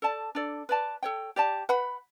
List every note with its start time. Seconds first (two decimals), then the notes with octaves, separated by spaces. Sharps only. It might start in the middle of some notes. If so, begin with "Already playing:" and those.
0.02 A4 D5 A5
0.35 D4 A4 D5
0.69 B4 D5 A5
1.03 A4 C#5 G5
1.36 G4 D5 A5
1.69 B4 F#5 B5